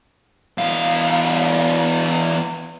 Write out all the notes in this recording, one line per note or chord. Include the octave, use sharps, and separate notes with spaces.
E2 F5